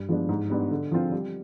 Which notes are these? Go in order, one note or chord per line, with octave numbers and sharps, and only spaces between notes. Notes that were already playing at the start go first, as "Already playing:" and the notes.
Already playing: G2
F3 G#3 B3 D4
G#2
G3 B3 D4
D3
F3 C4 F4
G3